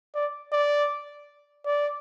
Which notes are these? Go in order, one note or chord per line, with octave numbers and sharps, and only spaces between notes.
D5
D5
D5